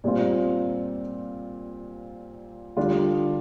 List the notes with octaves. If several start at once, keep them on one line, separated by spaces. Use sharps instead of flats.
A#2 G3 C4 F4
D3 G3 D4 F4